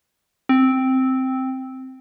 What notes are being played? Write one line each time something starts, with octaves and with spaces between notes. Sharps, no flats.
C4